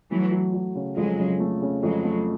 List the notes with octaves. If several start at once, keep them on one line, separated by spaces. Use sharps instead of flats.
E3 F#3 A3
F#3
F#3
C#3
F2 F#3 G#3
C#3
A3
C#3
F2 F#3 G#3
A3